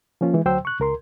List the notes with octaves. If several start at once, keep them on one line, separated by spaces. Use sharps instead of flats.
F3 A#3 C#4 F4
E3 G#3
D2 F#3 C5 G5 C6 E6
C#6 F#6
C#2 A#4 C6